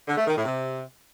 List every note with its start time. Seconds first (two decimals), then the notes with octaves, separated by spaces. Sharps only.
0.08 D3
0.17 A3
0.27 D#3
0.36 A2
0.45 C3